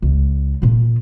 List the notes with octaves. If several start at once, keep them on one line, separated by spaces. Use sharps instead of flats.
C#2
A#2 F4